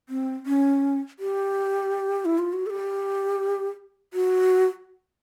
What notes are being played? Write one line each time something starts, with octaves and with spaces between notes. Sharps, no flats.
C4
C#4
G4
E4
F4
F#4
A4
G4
F#4